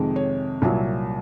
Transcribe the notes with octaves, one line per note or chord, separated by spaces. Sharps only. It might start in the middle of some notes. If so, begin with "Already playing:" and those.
Already playing: F2 C3 D#3 G#3
C#5
C2 A#2 F#3